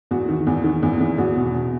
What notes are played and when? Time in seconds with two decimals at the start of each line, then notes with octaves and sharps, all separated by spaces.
0.11 E2 F#4
0.29 D#3
0.47 E2
0.64 D#3
0.83 E2
1.01 E2
1.18 E2 F#4
1.37 B2
1.54 B2